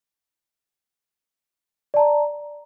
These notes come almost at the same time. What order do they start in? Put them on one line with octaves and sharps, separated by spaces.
D5 A5 A#5